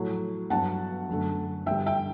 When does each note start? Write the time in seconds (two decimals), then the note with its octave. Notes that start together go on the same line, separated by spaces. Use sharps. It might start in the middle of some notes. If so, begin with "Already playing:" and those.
Already playing: A2 F#3 A3
0.50 G2 F#3 B3 F#5 A5
1.09 F#2 D3 A3
1.66 G2 D3 G3 E5 G5
1.86 E5 G5